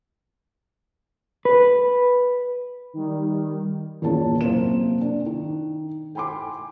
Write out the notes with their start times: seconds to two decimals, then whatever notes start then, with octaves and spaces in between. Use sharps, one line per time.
1.45 B4
2.93 D#3 G3
4.02 E2 A#2 A#3 C#4 A5
4.41 F#2 C3 A#3 C5 E7
5.01 D4
5.26 D#3
6.15 G5 G#5 B5 C6 D6